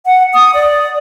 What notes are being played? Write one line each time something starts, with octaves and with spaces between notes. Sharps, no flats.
F#5
D#6
D5